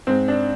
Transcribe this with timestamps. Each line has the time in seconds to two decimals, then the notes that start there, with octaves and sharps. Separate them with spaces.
0.07 G#2 C4
0.28 D4